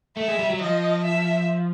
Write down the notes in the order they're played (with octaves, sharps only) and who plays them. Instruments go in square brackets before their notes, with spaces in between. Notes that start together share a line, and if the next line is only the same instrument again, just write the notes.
[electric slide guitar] A3 [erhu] E5
[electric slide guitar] G#3
G3
F#3
[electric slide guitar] F3 [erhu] D#5
[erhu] E5